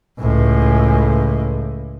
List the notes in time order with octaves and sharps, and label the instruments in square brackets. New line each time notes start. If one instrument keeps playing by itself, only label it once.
[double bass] C#2 A2